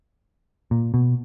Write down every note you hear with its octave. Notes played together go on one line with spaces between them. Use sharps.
A#2
B2